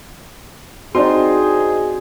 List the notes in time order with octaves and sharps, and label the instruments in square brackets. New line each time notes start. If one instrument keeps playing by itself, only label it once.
[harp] C4 D4 D5 [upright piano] D#4 C5 C6 [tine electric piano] F#4 [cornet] G#4